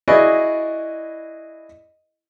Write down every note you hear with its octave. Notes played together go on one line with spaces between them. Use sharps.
E4 F#4 G#4 B4 D5 D#5